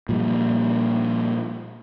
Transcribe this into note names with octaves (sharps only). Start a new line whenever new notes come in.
A#2 F3 G3